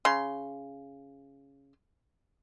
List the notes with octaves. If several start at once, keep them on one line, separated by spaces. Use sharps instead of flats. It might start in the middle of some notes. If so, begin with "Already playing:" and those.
C#3 C6